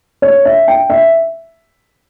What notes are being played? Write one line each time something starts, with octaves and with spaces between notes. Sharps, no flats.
C#5
E5
G5
E5